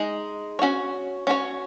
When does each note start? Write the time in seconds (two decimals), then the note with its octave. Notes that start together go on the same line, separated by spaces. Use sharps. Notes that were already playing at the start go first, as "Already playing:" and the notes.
Already playing: G#3 D#4 G#4 D#5
0.59 C#4 F#4 C#5
1.27 C#4 F#4 C#5